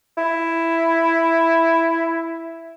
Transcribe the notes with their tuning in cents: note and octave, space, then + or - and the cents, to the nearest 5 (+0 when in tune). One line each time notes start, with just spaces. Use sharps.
E4 +5